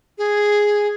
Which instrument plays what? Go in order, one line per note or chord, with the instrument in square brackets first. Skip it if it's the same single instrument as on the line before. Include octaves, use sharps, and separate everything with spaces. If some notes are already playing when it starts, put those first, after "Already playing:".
[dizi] G#4